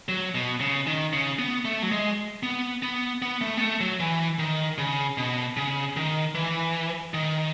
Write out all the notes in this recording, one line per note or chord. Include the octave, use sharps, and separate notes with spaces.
F#3
B2
C#3
D#3
C#3
B3
A3
F#3
G#3
B3
B3
B3
A3
B3
A3
F#3
E3
D#3
C#3
B2
C#3
D#3
E3
D#3